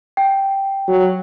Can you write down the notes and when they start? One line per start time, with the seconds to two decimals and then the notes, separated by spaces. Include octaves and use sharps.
0.17 G5
0.88 F#3